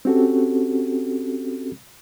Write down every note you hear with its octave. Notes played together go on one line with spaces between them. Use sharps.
C4 C#4 F#4 G4 A4